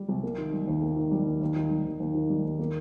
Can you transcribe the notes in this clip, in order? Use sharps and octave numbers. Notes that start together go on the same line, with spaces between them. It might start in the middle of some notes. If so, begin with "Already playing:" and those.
Already playing: G3
C2
A#3
D#3
G3
D#2
A#3
D#3
G3
D#2
D#2
D#3
G3
D#2
D#2
D#3
G3
D#2
A#3